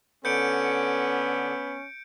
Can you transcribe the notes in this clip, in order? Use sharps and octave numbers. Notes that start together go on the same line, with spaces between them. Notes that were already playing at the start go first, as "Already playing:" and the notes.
D3 B3 C#4 A4 D5 G6 C#7 D7